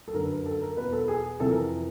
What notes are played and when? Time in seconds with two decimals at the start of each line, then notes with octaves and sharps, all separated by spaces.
0.08 A4
0.14 F#2 D3 A#4
0.25 B4
0.35 A#4
0.46 A4
0.61 A#4
0.77 E2 B2 B4
0.93 A4
1.08 G#4
1.40 F2 C3 E3 A4
1.50 A#4